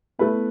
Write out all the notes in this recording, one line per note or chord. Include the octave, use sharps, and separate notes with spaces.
A3 B3 E4 B4